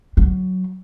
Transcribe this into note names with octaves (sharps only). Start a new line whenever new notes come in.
F#3